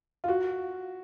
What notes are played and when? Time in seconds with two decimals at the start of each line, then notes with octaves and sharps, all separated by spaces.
0.24 F4
0.28 F#4